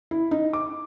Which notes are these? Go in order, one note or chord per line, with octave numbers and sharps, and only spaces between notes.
E4
D#4
D6